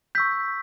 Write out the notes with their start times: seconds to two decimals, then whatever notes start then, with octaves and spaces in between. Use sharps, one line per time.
0.15 C#6 E6 G6 B6